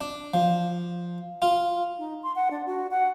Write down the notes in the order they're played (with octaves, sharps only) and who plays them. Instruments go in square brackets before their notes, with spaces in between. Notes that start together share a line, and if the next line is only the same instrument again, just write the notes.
[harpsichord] D4
F3
F4
[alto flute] D#4
C6
F#5
D4
F#4
F#5